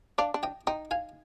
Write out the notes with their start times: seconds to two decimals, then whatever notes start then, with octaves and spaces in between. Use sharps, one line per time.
0.18 D4 D5 F5
0.34 D4
0.43 D#5 G5
0.67 D#4 D#5 G5
0.91 F5 G#5